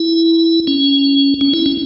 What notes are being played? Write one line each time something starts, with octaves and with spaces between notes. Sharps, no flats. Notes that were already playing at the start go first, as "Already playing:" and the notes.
Already playing: E4
C#4
C#4
E4
C#4